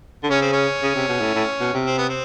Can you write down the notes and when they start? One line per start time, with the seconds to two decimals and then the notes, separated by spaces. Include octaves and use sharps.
0.23 D3
0.30 C#3 C#4
0.41 C4
0.53 C#4
0.82 C#3
0.95 C3
1.09 B2
1.21 A2
1.35 A2
1.60 B2
1.74 C3
1.86 C4
1.98 B3
2.09 C4